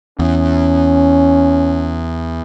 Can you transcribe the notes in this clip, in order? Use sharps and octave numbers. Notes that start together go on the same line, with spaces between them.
E2 C#4